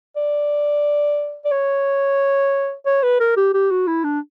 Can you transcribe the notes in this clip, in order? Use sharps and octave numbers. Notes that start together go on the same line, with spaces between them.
D5
D5
C#5
C#5
B4
A#4
G4
G4
F#4
E4
D4